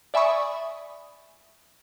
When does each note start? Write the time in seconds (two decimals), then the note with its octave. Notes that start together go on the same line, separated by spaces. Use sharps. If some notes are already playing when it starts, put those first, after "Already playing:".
0.14 D5 E5 G#5 B5 C#6 D#6